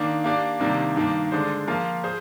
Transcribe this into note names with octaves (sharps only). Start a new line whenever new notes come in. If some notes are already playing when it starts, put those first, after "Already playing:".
Already playing: D#3 A#3 D4
A#3 D4 G4 D5
C3 D#3 G3 A#3 D4
G2 D#3 A#3 D4
D3 G#3 D4 G#4 C5
F3 A#3 F4 A#4 F5
G#4 C5